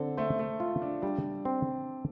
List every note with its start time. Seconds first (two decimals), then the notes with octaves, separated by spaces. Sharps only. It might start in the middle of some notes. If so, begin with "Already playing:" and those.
Already playing: D3 C4 A4
0.17 A3 C5
0.39 A3
0.60 F4
0.82 D4
1.02 G3 D4
1.45 C4